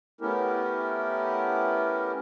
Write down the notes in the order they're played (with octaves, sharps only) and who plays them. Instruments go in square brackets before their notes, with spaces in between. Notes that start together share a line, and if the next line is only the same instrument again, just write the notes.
[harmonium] A3 B3 C#4 E4 G4 A#4